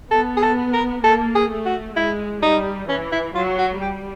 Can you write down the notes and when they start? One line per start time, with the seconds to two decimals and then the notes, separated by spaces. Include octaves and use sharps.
0.11 B3 A4
0.37 G#4
0.43 A4
0.73 A#4
1.04 A#3 A4
1.35 G#4
1.50 A3
1.66 F#4
1.96 G#3 E4
2.42 G3 D#4
2.89 E3 C#4
3.12 E4
3.34 F#3 F4
3.58 F#4
3.81 G3 G4